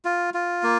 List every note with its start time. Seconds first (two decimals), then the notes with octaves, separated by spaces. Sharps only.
0.05 F4
0.34 F4
0.63 A#3